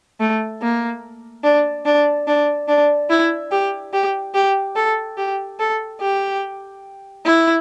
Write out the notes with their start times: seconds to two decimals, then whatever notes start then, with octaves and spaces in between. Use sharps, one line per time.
0.20 A3
0.62 A#3
1.44 D4
1.85 D4
2.27 D4
2.68 D4
3.10 E4
3.51 G4
3.93 G4
4.34 G4
4.76 A4
5.17 G4
5.59 A4
6.01 G4
7.25 E4